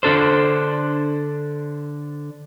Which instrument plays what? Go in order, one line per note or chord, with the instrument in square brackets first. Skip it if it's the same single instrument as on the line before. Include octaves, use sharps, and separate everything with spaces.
[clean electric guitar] D3 D4 A4 C5